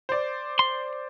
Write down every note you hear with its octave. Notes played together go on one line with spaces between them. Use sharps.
C5 D5
C6